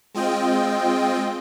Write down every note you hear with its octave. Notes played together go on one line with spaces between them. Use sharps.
G#3 C4 F4 D#5 G5